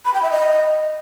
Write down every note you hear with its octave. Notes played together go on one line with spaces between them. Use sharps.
B5
G5
E5
D#5